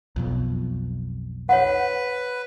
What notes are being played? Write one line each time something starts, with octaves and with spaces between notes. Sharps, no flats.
B1 F2 B2
B4 C#5 F#5